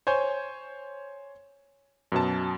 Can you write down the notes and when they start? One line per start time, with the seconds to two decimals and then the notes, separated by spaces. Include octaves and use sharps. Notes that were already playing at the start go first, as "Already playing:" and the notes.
0.07 C5 C#5 G#5 G6
2.12 F#2 B2 A5